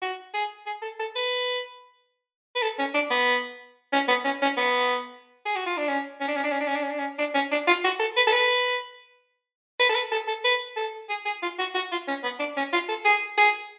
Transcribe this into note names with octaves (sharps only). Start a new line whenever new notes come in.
F#4
G#4
G#4
A4
A4
B4
B4
A4
C#4
D4
B3
C#4
B3
C#4
C#4
B3
G#4
F#4
F4
D4
C#4
C#4
D4
C#4
D4
C#4
D4
C#4
D4
C#4
D4
C#4
D4
C#4
D4
F4
F#4
A4
B4
A4
B4
B4
A4
B4
A4
A4
B4
A4
G#4
G#4
F4
F#4
F#4
F4
C#4
B3
D4
C#4
F4
A4
G#4
G#4